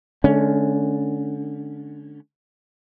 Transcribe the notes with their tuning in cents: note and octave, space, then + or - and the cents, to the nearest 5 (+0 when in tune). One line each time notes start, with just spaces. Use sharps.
D3 +0 G#3 +45 C#4 +5